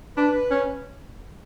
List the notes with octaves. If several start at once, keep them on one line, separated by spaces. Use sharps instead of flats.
D4 B4
C#4